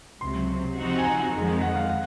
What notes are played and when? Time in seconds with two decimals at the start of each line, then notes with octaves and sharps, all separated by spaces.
0.21 C#2 C3 F#3 C6
0.77 C3 F3 C4 D#4 F#4
0.99 G#5
1.05 A#5
1.33 F2 D#3 G#3
1.61 F#5
1.76 F5
1.89 F#5